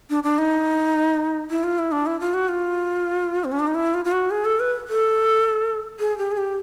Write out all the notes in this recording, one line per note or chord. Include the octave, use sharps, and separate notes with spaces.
D4
D4
D#4
E4
F4
E4
D4
E4
F4
F#4
F4
C4
C#4
D4
D#4
E4
F4
F4
F#4
G#4
A4
B4
A4
G#4
G4
G#4
G4